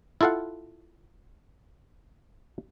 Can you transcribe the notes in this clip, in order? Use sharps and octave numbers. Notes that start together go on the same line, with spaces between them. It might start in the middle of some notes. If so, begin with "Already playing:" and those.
E4 F4 A4 F5 F#5